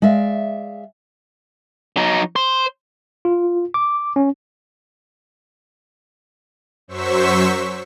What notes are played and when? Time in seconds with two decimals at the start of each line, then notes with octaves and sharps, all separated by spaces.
0.02 G#3 D5 E5 F5
1.97 F#3 D#4
2.36 C5
3.25 F4
3.74 D6
4.16 C#4
6.88 F#2 F#3 C5 C#6 E6 B6